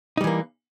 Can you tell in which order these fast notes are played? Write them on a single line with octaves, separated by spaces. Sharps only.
D#4 G3 E3 A#3